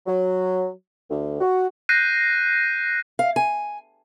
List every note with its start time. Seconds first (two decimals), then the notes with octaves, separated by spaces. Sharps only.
0.07 F#3
1.10 D2
1.41 F#4
1.89 F#6 G6 A#6 C7 D#7
3.19 F5
3.36 G#5